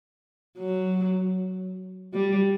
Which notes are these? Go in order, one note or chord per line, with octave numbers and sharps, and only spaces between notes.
F#3
G3